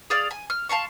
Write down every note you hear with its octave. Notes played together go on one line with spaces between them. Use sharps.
G#4 D5 F5
G#5
F6
F5 A5 C6 C#6